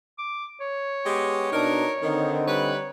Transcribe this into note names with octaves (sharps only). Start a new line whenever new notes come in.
D6
C#5
G#3 B3 G4
B2 D4 D#4 A#4
D3 D#3 C4 D#4
G3 B4 C#5